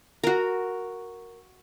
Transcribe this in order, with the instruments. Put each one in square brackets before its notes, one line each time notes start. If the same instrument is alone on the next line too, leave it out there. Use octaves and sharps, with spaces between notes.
[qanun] F#4 A#4